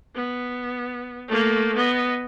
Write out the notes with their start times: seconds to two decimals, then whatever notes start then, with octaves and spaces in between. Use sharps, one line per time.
0.15 B3
1.28 A3 A#3
1.76 B3 D#5